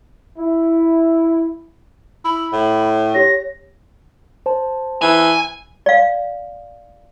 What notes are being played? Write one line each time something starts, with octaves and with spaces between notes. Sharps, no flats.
E4
E4 B5
A2
G4 C#5 A#6
C5 A5
E3 G#5
D5 F5